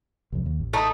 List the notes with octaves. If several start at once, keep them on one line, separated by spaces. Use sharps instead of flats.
C2 F2
D#2
A1
A3 D#4